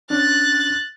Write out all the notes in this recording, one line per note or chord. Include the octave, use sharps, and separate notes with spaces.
C#4 D4 F#6 A6